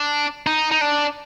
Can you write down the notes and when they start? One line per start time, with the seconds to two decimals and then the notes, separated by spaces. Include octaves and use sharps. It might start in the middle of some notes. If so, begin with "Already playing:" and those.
Already playing: D4
0.47 D#4
0.72 D#4
0.81 D4